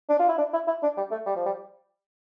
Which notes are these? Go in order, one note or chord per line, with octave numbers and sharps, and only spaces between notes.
D4
F4
E4
D4
E4
E4
D4
G3
A3
G3
F3
G3